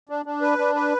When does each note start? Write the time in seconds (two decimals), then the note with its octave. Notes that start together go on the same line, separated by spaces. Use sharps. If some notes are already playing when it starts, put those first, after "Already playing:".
0.09 D4
0.26 D4
0.42 B4
0.58 D4
0.75 B4